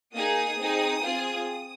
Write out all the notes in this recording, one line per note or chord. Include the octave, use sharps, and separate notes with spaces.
A#3 D#4 G#4 D#6
C4 D#4 G#4
C4 F4 G#4